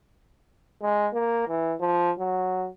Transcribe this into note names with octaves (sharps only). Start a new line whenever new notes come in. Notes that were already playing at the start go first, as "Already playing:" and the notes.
G#3
A#3
E3
F3
F#3